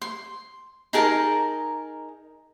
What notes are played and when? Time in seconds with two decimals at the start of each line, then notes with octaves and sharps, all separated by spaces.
0.01 C6
0.93 D#4 G#4 A#4 A5